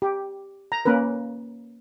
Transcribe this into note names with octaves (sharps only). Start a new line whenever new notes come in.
G4
A#5
A#3 C#4 A#4 B4